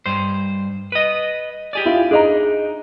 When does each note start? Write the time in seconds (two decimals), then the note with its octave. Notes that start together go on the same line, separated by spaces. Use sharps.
0.06 G2 C5
0.92 B4 D#5
1.73 G4 G#4 D5
1.86 E4 F4
2.11 D4 D#4 G#4 D#5 A#5